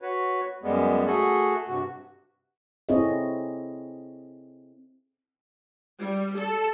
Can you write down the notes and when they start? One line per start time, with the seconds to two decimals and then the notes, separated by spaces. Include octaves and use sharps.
0.02 F#4 B4 C#5
0.63 F#2 G3 G#3 B3
1.06 A3 F#4 G#4 A4
1.68 G2 C3 F#4
2.89 C4 E4 G#4 A4 C#5 D#5
5.98 G3
6.37 A4